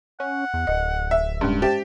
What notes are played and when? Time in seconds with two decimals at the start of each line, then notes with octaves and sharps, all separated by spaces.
0.20 C#4 F#5
0.54 E2
0.67 D1 D#5
1.11 E5
1.41 D1 G2 G#3 C#4
1.62 G4 C5 E5 A5